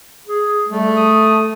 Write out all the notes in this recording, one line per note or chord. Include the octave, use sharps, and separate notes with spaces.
G#4
G3 A3
D#6